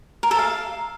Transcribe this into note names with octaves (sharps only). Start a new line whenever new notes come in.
A#4
A4
F5